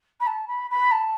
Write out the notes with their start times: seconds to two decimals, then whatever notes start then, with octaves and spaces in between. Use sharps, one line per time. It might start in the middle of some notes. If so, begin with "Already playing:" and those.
0.20 B5
0.27 A5
0.48 B5
0.71 B5
0.91 A5